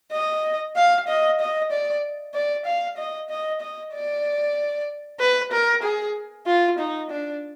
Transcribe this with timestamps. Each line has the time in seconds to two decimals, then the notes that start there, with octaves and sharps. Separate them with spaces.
0.12 D#5
0.76 F5
1.08 D#5
1.40 D#5
1.72 D5
2.34 D5
2.66 F5
2.97 D#5
3.30 D#5
3.61 D#5
3.94 D5
5.20 B4
5.52 A#4
5.83 G#4
6.47 F4
6.79 D#4
7.10 D4